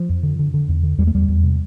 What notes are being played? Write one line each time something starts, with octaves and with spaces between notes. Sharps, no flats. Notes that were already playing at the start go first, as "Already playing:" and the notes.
Already playing: F3
F2
D3
D3
D3
E2
D3
E2 G3
A3
E2 G3
E2
C3